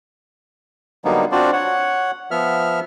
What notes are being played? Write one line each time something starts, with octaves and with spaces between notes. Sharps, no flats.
D3 F#3 G3 A#3 B3 D#4
C4 D4 F4 F#4 C5 D5
C#5 F#5
F3 B3 E5 F6